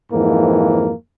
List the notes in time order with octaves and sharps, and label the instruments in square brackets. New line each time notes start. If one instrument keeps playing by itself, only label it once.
[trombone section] F2 G#2 E3 A#3